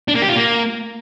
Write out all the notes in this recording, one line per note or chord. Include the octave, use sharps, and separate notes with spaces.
D4
A#3
G4
F4
A#3